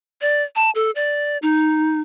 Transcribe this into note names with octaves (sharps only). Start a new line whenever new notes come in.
D5
A5
A4
D5
D#4